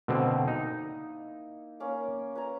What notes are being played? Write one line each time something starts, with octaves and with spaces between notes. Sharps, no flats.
B2 D3 A#3 C4 E4
D#4
A#3 C#4 D6
B4 G#5 A#5